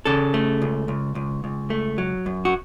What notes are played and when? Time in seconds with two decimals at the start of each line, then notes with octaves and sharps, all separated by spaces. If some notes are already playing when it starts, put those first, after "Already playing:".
0.05 C#3 A4
0.34 A3
0.62 C#2
0.88 C#2
1.15 C#2
1.44 C#2
1.70 A3
1.98 F#3
2.26 F#2
2.45 F#4